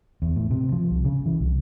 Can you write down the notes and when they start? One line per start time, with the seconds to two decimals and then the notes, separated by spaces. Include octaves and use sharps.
0.22 E2
0.36 A2
0.51 C3
0.72 F3
0.91 C2
1.05 C#3
1.26 E3
1.40 C2